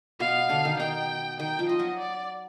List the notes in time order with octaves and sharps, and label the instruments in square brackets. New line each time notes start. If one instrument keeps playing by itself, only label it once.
[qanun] B2 B3 [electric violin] F5
[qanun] D3 D4
D#3 D#4
[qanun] D#3 D#4 [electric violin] G5
[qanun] D#3 D#4 [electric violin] G5
[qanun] F3 F4
[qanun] F4 [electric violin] D#5
[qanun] F#3 F#4
[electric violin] D5